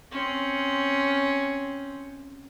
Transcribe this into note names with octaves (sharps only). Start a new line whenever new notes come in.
C4 C#4